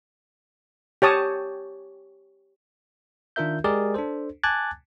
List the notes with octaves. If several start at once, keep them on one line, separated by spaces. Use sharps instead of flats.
G4 C#5 A5 D#6
D#3 D4 F4 A#4 E5 G6
G#3 G4 G#4 A#4 D5
D4 A4 C5
G#5 A5 D6 F#6 G#6 A6